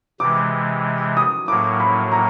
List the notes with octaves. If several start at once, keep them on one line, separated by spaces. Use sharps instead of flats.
C3 E3 G#3 D6
D#6
A2 F#3 A#3 D6
B5
A#5